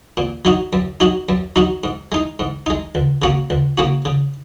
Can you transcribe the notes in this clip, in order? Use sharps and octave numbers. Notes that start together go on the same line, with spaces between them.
A#2
F#3 D#4 F#4
F#2
F#3 D#4 F#4
F#2
F#3 D#4 F#4
G#2
G#3 D#4
G#2
G#3 D#4
C#2
C#3 A#3 C#4 F#4
C#2
C#3 A#3 C#4 F#4
C#3